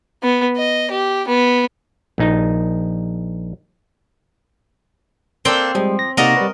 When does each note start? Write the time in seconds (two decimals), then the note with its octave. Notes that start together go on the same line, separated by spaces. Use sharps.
0.23 B3
0.57 D#5
0.91 G4
1.28 B3
2.18 A#1 D#4
5.45 A#3 C4 D4 A4 C5 G5
5.75 F3 G3 G#3
5.99 A#6
6.17 C3 A#3 D#4 F#4 A#4 D5 D#5 A#5
6.36 G3 B4